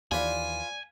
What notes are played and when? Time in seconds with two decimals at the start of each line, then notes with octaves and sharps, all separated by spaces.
0.12 D#2 E3 F4 B4 C5 D5 F5 G#5